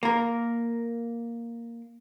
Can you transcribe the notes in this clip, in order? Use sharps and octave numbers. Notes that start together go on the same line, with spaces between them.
A#3 A#4